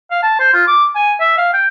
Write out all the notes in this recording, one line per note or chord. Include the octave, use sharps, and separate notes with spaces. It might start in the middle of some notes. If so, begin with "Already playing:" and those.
F5
A5
C5
F4
D6
G#5
E5
F5
G5